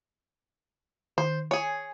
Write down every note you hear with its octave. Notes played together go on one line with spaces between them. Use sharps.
D#3 C5
G#4 C#5 G#5